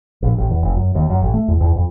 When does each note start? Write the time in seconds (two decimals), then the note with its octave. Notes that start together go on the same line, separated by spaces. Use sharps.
0.22 A#1
0.38 A1
0.51 E2
0.63 F1
0.76 F#2
0.95 D#2
1.10 F#2
1.22 A1
1.34 A3
1.48 E2
1.61 E2
1.76 F2